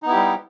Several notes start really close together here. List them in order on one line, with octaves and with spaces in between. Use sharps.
D#4 B3 E4 G4 G3